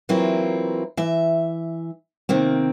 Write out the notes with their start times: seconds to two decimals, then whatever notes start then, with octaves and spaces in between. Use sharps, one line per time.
0.09 E3 F#3 A#3 C4 E4 F4
0.97 E3 E5
2.29 C3 D#3 A#3 C4